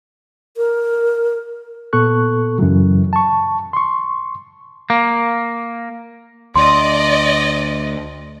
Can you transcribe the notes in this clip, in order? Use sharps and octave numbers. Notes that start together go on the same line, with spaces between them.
A#4
A#2 B3 A4 C#6 F#6
F#2 C#3 E3 F#3
A5 C#6
C6 C#6
A#3
D2 D5 D#5 C6